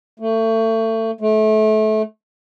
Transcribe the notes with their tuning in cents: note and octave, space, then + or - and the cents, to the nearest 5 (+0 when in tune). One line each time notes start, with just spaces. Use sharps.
A3 +30
A3 -25